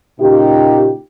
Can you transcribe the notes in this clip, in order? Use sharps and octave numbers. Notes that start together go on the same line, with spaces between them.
A#2 C#3 D#4 G4